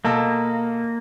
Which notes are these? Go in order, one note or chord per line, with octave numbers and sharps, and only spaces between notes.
B2 A#3 A4